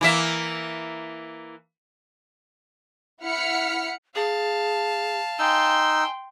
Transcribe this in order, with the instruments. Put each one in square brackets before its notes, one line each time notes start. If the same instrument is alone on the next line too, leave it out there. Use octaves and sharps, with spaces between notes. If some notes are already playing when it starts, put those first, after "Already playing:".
[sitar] E3 A#3 E5
[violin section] E4 F#5 F6 B6 C#7
[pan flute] G#4 [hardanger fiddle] F5 A5
[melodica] D#4 E6 [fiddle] G5 C6 [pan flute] G#5